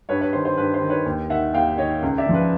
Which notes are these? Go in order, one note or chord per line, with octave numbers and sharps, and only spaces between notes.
G2 B4 C#5
B4 C#5
D#3 C5
C5
G2 B4
C5
D#3
B4 C#5
D#2
D#3 E5 F#5
D#2 F5 G5
D#3 C#5 D#5
C#2
D5 E5
C#3 F3
B4